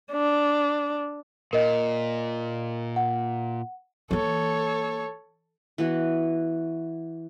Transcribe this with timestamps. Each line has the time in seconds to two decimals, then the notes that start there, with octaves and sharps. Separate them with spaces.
0.12 D4
1.53 A#2 A#4 D#5
2.96 F#5
4.11 E3 A#3 A4 C#5
5.78 E3 B3 F#4